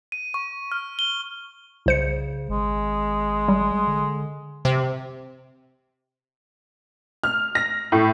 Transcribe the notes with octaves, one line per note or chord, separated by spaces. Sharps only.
D#7
C#6
F6
G7
C2 C#3 C5 C#7
G#1 G#3
G3
D3
C3
F6
A#6
A2